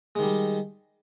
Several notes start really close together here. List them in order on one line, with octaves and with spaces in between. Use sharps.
G#3 D#3 G3